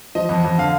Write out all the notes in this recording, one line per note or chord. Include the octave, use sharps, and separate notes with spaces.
F3 D#5
F2
F2
D3 F5